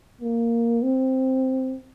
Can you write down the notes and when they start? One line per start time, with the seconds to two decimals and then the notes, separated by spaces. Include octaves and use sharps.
0.21 A#3
0.83 C4